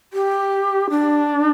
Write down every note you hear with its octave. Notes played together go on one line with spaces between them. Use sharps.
G4
D4